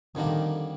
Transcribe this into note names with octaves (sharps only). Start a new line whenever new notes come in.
F2 D3 D#3 G3 A#3 D4